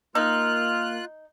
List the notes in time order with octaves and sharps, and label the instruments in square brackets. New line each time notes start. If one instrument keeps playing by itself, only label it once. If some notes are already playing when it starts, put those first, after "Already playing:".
[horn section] A#3 [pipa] D#4 [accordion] F4 F#6 [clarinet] F6